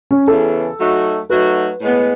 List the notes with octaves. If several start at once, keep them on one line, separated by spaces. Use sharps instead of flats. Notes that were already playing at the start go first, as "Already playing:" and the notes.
C#4
E2 C#3 E3 B3 A4
F#3 A3 D#4 F#4
F#3 A3 D#4 F#4 B4
A2 G#3 B3